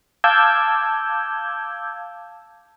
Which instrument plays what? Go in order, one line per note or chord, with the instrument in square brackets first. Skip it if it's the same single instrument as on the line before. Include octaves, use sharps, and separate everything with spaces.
[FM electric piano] F5 A5 D6 E6 G6 G#6